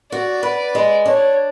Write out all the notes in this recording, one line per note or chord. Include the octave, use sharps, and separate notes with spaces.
F#4 D5
B4
G#3
D4 C#5